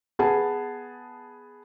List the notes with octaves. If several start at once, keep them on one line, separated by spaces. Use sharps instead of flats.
B3 G#4 A5